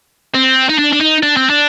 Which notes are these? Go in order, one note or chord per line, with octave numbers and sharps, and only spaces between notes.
C4
D#4
D4
D4
D#4
D4
C4
D4